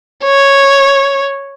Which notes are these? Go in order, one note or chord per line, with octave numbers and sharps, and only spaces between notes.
C#5